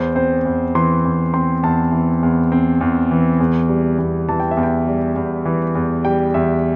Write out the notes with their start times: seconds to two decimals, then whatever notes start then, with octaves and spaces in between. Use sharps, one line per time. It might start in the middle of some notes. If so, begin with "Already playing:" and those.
Already playing: E2 C5
0.16 C4 C5
0.46 E2
0.75 E3 C6
1.05 E2
1.34 C4 C6
1.63 E2 A5
1.92 E3
2.23 E2
2.52 C4
2.81 E2
3.11 E3
3.40 E2
3.69 G3
3.99 E2
4.29 E3 A5
4.40 G5
4.51 E5
4.57 E2
4.63 G5
4.87 G3
5.16 E2
5.45 E3
5.75 E2
6.05 G3 G5
6.34 E2 E5